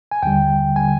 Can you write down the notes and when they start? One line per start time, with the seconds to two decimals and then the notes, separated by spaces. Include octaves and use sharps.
0.11 G#5
0.23 D#2 D3 G3 G5
0.76 D3 G3 G#5